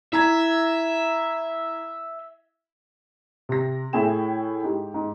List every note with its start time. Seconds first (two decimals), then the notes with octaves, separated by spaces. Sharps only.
0.13 E4 E5 A#5 G#6
3.49 C3 A#6
3.93 A2 E4 G#4 G5 E7
4.64 G#2 G4
4.94 G#2